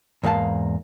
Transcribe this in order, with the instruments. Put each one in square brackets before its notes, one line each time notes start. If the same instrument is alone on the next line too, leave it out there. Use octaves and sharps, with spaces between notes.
[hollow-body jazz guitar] E2 G#2 A#3 F5 A5